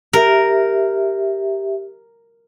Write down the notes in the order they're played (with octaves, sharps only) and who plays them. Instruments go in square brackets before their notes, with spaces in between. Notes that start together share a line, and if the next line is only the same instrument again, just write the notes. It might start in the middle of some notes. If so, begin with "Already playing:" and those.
[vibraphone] G4 E5 [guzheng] A#4